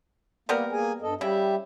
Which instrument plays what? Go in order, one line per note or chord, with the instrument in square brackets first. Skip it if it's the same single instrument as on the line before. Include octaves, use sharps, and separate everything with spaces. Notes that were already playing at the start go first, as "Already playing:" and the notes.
[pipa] G3 B3 A#4 [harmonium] A#3
[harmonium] A#3 G#4 G#5
G2 A4 D#5
[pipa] C#3 E4 [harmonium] G3 G4 E5